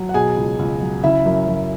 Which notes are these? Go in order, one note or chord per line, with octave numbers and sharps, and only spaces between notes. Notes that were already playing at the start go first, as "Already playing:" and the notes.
Already playing: F#3
F#5
B2 G#4 G#5
C#2
C#2
F#3
C#3 E4 E5
F#2
F#2